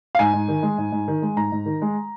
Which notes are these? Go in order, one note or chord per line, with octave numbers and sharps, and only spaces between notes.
F5
G#2 G#5
G#2
D#3
G#3
G#2
G#2
D#3
G#3
G#2 A#5
G#2
D#3
G#3